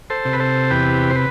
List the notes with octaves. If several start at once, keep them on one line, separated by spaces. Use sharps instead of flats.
A4 C5
C3
B4
A4 C5
E2 G4 B4
C5
B4